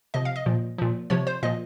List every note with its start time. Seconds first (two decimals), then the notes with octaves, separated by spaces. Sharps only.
0.14 C3 F3 D#5
0.25 F5
0.36 D#5
0.46 A#2 F3
0.78 A#2 F3
1.10 C3 F3 C#5
1.27 C5
1.43 A#2 F3 D#5